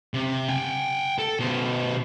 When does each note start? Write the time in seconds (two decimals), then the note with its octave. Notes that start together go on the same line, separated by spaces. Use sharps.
0.14 C3
0.48 G5 G#5
1.19 A4
1.39 B2 C5